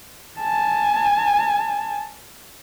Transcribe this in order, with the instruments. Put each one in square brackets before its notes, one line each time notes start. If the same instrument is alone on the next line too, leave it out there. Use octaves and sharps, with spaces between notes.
[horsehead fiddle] G#5 A5